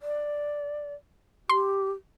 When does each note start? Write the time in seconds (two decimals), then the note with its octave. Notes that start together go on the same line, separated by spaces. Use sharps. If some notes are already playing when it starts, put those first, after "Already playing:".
0.02 D5
1.49 G4 C6